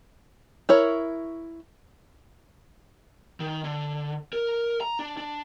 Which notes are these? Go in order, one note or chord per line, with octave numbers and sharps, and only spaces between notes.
E4 A#4 C#5
D#3
D3
A#4
A#5
D4
D4